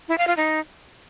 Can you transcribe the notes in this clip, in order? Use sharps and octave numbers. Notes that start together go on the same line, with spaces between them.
E4
F5
F4
D#4